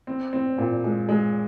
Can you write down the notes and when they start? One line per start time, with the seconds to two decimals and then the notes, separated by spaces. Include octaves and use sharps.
0.07 C4
0.33 C4
0.58 A#2
0.84 G#3
1.09 G#3